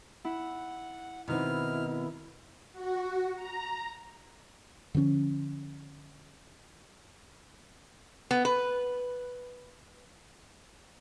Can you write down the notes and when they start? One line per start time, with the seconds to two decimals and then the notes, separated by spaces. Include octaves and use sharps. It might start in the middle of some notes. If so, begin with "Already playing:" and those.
0.25 E4 F#5
1.28 B2 D#3 C4 D#4 E4 F6
2.73 F#4
3.36 A#5
4.95 D3 F3 C4 C#4
8.31 B3
8.45 B4